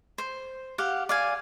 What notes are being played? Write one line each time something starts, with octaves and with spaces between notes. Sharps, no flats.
C5
G4 F5 F#5
D5 F5 G#5